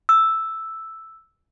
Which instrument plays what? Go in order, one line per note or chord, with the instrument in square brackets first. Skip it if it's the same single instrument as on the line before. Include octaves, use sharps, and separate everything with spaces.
[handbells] E6